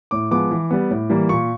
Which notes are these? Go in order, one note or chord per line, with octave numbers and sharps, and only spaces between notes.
A2 D6
F3 G#3 B3 D6
E3
G3 B3
A2
E3 G3 A#3
A#2 C#6